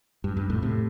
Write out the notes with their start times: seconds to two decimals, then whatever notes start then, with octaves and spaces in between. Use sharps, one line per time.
0.24 G2
0.37 G2
0.50 F2 A2
0.62 A2 C3